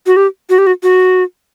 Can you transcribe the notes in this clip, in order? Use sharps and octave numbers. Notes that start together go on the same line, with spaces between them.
F#4
G4
F#4
G4
F#4
F#4